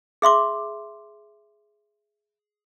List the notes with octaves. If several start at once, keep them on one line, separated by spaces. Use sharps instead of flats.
G#4 E5 C6 D6